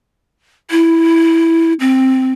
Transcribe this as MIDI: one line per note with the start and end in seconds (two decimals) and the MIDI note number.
0.71 1.73 64
1.80 2.33 60